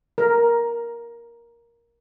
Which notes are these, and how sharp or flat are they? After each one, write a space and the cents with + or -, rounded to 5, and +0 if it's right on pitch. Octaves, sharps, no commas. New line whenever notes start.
A#4 +10